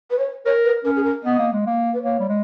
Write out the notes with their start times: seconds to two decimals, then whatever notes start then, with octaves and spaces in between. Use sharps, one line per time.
0.11 B4
0.19 C#5
0.46 A#4 C#5
0.64 B4
0.85 C#4 A#4
0.96 G#4
1.04 A#4
1.23 B3 D#5
1.39 A#3
1.52 G#3
1.66 A#3
1.94 B4
2.03 A#3 C#5
2.20 G3
2.28 G#3